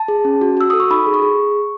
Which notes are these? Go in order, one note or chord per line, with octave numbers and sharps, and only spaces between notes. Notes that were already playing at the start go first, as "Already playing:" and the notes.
Already playing: A5
G#4
C#4
F#4
F#4 E6
A4 D#6
C#6
D#4 B5
G#4
C#6
G#4